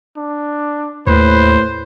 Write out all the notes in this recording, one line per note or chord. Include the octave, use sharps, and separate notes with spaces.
D4
D#2 A2 B4 C5